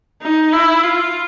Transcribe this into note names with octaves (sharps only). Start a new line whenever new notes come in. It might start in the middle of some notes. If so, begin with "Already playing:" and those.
D#4
E4
F4